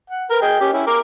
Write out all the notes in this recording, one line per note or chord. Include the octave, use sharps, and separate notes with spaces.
F#5
A#4 B4
G#4 D#5 G5
C#4 G4
C#4 E4
A#4 D6